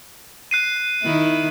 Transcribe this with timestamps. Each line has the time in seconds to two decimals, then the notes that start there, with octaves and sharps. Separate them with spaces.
0.51 F#6 C7 D#7
1.03 D#3 E4